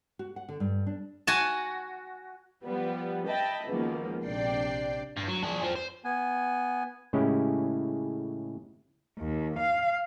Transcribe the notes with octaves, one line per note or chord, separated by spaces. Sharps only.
F#4
F#5
D3
G2
D4
F#4 G#5 A5
F3 G3 B3
D#5 E5 G5 A5 B5
C#2 B2 D#3 F3 A#3
A#1 C3 D4 D5 G5 C7
G2
F#3
D4 G#4
F3 C4
C5
B3 G#5
A2 C#3 G#3 C#4 E4 G4
D#2
F5